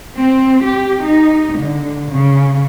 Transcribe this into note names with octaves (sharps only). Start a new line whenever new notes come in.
C4
G4
D#4
D3
C#3